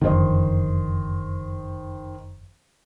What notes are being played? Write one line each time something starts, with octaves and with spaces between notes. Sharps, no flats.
F#1 F2 D3 D#3 C5 D#5